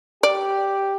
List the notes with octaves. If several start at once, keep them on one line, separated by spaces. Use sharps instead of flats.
G4 D5